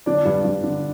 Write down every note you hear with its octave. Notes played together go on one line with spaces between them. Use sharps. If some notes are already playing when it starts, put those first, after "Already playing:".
D3 D4 D5
G2
G2
D3